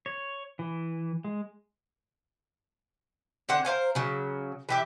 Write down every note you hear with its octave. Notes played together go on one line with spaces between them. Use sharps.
C#5
E3
G#3
D3 C4 F#5
A#4 C5 F5 G#5
C#3 F#3
E3 G4 E5